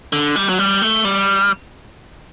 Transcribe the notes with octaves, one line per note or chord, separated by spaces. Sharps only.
D3
G3
F#3
G3
A3
G3